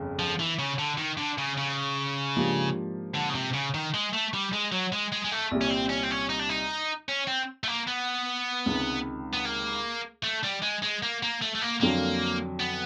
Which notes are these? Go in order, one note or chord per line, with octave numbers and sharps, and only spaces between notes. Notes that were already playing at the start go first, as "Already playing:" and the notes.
Already playing: G1 F2 C#3
F3
E3
C#3
D3
D#3
D3
C#3
C#3
G#2 F3 A#3 D4 G4
D3
C#3
C3
C#3
D#3
G#3
A3
G3
G#3
F#3
G#3
G#3
G#3
A3
C2 A#2 G3
C#4
C4
C#4
C4
C#4
D#4
D4
D#4
C#4
C4
A3
A#3
B3
C#2 C3 D#3
B3
A#3
A3
G3
G#3
G#3
A#3
A#3
A3
A3
A#3
F2 D3 F#3 A#3
B3